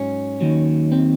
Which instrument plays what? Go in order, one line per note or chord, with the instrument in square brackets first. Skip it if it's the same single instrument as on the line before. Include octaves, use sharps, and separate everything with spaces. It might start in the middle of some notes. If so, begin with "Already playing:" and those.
Already playing: [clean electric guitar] G#2 F#3 C#4
D#2 D#3 F#3
C4